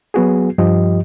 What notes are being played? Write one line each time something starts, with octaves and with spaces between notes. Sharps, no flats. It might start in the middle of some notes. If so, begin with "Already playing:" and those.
F#3 B3 F#4 G#4
G2 F3 G4 D#5